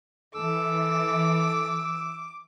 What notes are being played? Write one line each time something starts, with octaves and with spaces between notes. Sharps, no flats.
E3 A4 D6 E6